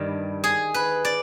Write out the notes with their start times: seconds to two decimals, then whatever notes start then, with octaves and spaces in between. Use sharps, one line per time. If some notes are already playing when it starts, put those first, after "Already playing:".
Already playing: G2 D#3 G3
0.44 G#4
0.74 B4
1.05 D5